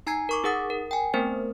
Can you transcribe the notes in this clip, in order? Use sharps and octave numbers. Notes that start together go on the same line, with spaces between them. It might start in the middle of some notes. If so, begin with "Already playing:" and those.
D#4 G#5 A#5 G#6 C7
A#4 C#6 D6
D#4 G#4 A#4 F#5 D#6 A6
A#4
G5 G#5
A3 B3 C4 A#4 C5